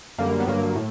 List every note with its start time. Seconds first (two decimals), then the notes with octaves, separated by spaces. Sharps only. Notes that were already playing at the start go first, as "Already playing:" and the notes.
0.18 F#2 D3 G3 A#3
0.40 B3
0.47 G2 D3 F#3 A#3
0.76 A2